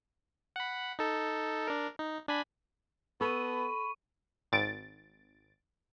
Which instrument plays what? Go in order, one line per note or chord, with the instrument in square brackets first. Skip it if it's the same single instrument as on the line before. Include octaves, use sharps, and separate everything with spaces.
[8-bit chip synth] F#5 B5
D#4 A4
D4 A#4
D#4
D4 G#5 B5
[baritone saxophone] B3 [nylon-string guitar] A4 [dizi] B5 [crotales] C#6 D#7
[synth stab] G#1 A6 D7